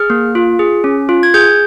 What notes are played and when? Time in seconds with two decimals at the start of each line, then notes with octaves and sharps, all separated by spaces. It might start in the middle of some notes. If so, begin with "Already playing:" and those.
Already playing: G#4 F6
0.10 A#3
0.35 F4
0.59 G#4
0.84 C#4
1.09 F4
1.23 G#6
1.34 G#4 G6